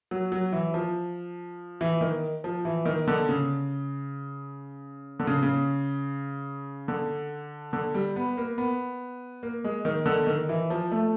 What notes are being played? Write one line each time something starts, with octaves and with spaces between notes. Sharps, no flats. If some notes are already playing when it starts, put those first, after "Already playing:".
F#3
F#3
E3
F3
E3
D#3
F3
E3
D#3
D3
C#3
D3
C#3
C#3
D3
D3
G3
B3
A#3
B3
A#3
G#3
D#3
D3
D#3
E3
F3
A3